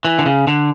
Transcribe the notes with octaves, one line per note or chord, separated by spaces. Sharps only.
E3
D3
C#3
D3